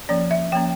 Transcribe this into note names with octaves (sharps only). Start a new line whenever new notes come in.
F3 A#3 C#4 D5
E5
F3 A#3 C#4 G5